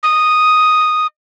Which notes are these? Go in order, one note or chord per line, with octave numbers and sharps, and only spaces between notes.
D#6